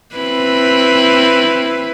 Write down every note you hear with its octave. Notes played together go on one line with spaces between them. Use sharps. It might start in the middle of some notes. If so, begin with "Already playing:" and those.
C4 E4 B4